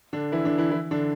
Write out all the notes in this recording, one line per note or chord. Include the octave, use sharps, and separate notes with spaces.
D3 D4
E3 E4
D3 D4
E3 E4
E3 E4
D3 D4